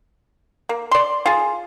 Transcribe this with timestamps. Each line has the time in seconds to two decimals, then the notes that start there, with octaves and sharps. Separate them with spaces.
0.69 A#3
0.91 D5 C6
1.26 F4 G#4